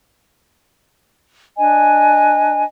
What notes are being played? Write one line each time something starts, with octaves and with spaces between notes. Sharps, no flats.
D4 D#5 G#5